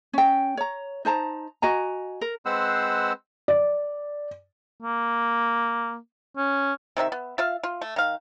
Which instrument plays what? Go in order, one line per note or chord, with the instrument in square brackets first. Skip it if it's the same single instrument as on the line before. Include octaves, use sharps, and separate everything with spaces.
[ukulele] C#4 G5
C#5 A#5
D#4 C5 A5 A#5
F#4 D#5 G#5 A#5
A#4
[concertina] G#3 C4 B4 C5 F#5 E6
[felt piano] D5
[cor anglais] A#3
C#4
[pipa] C3 D#3 C#4 E5
B3
F4 E5 F5
F4
A3
D#3 F5